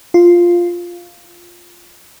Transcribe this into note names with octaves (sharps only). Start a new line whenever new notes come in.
F4